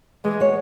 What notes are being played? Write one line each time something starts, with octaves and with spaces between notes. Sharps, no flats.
E3 G#3
G#3 B3 F#4 C#5